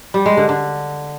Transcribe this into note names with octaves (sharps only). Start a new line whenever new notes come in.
G3
G#3
D3
D3